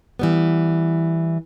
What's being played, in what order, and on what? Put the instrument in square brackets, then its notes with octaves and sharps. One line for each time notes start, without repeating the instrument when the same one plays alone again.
[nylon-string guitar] E3 G3 B3